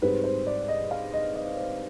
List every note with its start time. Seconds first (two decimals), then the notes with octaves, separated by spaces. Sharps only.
0.02 G#2 G3 C4 B4
0.24 C5
0.47 D5
0.68 D#5
0.91 F5
1.13 D#5
1.35 D#5
1.57 C5